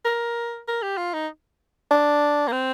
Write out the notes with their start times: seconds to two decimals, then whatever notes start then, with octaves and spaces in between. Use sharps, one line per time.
0.05 A#4
0.68 A#4
0.82 G4
0.98 F4
1.13 D#4
1.91 D4
2.48 A#3
2.52 C4